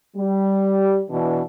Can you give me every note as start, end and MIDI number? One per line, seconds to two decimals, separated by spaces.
0.16 1.02 55
1.11 1.42 47
1.11 1.42 52
1.11 1.42 62